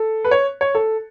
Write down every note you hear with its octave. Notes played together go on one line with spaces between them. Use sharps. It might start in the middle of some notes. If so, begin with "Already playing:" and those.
Already playing: A4
B4
C#5
C#5
A4